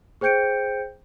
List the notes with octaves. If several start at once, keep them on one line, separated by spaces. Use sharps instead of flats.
G#4 C5 G5 G6 C#7 D7